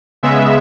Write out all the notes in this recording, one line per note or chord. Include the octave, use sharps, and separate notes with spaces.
C#3 G#3 B3 E5